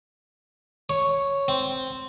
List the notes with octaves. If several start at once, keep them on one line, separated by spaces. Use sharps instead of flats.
C#5
C4